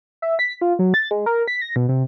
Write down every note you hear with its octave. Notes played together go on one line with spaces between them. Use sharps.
E5
B6
F4
F#3
A6
G#3
A#4
B6
A#6
B2
C3